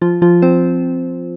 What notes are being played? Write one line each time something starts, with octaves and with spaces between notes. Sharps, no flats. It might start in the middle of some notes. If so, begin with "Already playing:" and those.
F3 F4
F3 F4
C4 C5